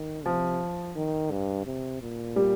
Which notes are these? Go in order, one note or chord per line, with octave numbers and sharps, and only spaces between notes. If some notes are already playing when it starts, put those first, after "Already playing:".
Already playing: D#3
C3 F3
D#3
G2
C3
A#2
G3